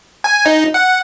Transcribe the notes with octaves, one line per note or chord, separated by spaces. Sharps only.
G#5
D#4
F#5